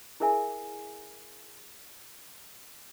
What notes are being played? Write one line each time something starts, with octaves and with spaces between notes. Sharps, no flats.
E4 G#4 A#4 E5 G#5